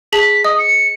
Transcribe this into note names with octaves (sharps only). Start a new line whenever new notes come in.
G#4 A5 B6 F#7
D#5 D#6
C#7